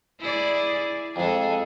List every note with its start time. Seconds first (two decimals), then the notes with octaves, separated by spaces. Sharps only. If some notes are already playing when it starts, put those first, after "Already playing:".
0.20 E4 G#4 D5
1.16 F2 G#3 G#4 A4